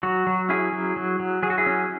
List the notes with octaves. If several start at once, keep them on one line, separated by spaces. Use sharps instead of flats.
F#3 F#4
F#3
C#4 E4 G#4
F#3
F#3
F#3
F#3 G#4
F#4
E4 G#4
C#4